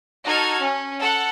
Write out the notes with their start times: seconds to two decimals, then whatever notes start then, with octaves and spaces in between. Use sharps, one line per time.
0.24 D#4 F#4 A4 F6 G#6
0.60 C#4
0.97 A4 F#5